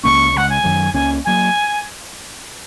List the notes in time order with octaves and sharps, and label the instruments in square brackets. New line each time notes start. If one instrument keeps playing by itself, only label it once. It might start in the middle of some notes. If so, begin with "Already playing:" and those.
[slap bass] C#2 C#3 A#3 C#4 [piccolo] C#6
[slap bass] C#2 C#3 G#3 [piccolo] F#5
[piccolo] G#5
[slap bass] F#2 D#3 F#3
[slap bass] C#2 C#3 A#3 C#4 [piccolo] G#5
[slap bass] F#3 A#3 [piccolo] G#5